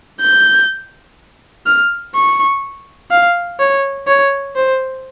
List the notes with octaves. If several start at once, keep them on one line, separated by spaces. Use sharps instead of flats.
G6
F6
C#6
F5
C#5
C#5
C5